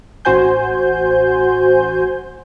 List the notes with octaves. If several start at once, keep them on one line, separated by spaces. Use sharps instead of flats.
A1 F#4 C5 G#5 G6